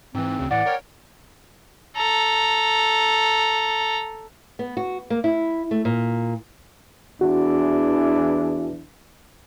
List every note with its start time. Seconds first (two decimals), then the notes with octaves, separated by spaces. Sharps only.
0.15 G#2 E3 C4
0.39 D2 C#3
0.51 A2 E3 D5 F#5
0.66 A#4 C#5 G5
1.96 A4 A#5
4.59 B3
4.77 F#4
5.10 A#3
5.24 E4
5.71 A3
5.85 A#2
7.21 E2 E3 D4 F#4